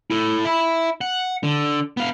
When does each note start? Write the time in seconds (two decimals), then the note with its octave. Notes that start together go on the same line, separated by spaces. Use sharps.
0.11 E4 A4
0.45 E5 B5
1.01 F#5
1.43 D3
1.97 B3 F5